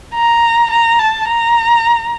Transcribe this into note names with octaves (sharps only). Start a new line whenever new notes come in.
A#5
A#5
A5
A#5